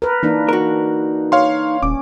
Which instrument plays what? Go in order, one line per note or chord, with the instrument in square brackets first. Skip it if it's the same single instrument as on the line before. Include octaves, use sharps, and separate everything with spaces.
[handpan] A#4 B4
[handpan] E3 A#3 D4 [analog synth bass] D#4
[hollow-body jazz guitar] F#4 A#4
[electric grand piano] C#5 F5 C6
[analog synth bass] D#1 [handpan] C#4 [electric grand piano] D6